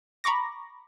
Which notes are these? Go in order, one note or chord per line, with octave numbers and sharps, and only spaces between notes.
A#5 B5 C#6 D6 A#6